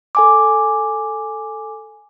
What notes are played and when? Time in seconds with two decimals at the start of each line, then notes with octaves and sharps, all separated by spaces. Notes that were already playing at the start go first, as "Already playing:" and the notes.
0.15 A4 G#5 D6